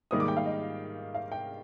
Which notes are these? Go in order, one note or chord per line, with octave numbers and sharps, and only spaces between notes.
G#2 D#3 G3 A#3 D#6
D6
G5
F5
D#5
F5
G5